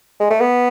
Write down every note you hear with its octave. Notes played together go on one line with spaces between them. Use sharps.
G#3
A3
B3